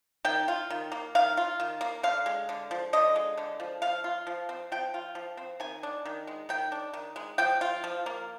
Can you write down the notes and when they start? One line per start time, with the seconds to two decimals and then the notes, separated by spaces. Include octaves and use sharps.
0.25 D#3 G5
0.48 F4
0.70 D#3
0.92 A#3
1.15 D#3 F5
1.37 F4
1.60 D#3
1.81 A#3
2.03 D3 F5
2.26 G#3
2.49 D3
2.71 F3
2.93 D3 D#5
3.16 G#3
3.37 D3
3.60 F3
3.82 F3 F5
4.04 F4
4.27 F3
4.49 C4
4.72 F3 G5
4.94 F4
5.15 F3
5.37 C4
5.60 D#3 G#5
5.83 D4
6.06 D#3
6.27 G#3
6.49 D#3 G5
6.72 D4
6.94 D#3
7.16 G#3
7.38 F3 G5
7.61 F4
7.84 F3
8.06 A#3